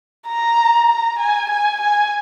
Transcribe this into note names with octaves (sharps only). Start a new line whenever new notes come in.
A#5
A#5
G#5
G#5
G#5